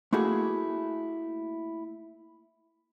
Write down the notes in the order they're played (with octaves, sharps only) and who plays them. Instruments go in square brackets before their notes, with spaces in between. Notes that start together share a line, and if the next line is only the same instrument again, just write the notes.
[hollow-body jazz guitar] A3 A#3 E4 F#4 G#4